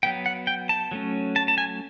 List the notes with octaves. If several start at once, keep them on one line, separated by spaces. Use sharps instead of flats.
F#3 B3 G5
F#5
G5
A5
F#3 A3 C#4
A5
A5
G#5